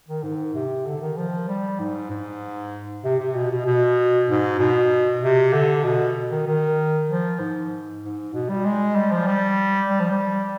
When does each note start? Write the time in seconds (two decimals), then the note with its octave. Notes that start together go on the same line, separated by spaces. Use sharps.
0.08 D#3
0.23 G#2
0.54 C3
0.86 D3
1.01 D#3
1.17 F3
1.48 G3
1.79 G#2
2.10 G#2
3.04 C3
3.20 C3
3.35 B2
3.51 B2
3.66 B2
4.28 G#2
4.59 B2
5.22 C3
5.53 D3
5.84 B2
6.31 D#3
6.47 D#3
7.09 F3
7.40 G#2
8.02 G#2
8.34 B2
8.49 G3
8.65 G#3
8.96 G3
9.11 F3
9.27 G3
9.89 G3
10.00 F3
10.11 G3